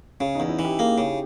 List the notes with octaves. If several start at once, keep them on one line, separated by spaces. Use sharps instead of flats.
C#3 C#4
E2 D#4
E4
E3
G4
A#3 G#4
C#3
G4